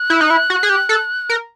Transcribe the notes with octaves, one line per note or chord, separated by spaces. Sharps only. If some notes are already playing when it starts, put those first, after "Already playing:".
Already playing: F#6
E4
D#4
E4
F#4
G#4
G4
A4
A#4